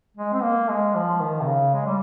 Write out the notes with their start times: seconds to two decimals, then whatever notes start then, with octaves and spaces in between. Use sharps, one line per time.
0.17 G#3
0.33 C4
0.43 A#3
0.69 G#3
0.95 F3
1.21 D#3
1.41 C3
1.47 C#3
1.74 G#3
1.86 G3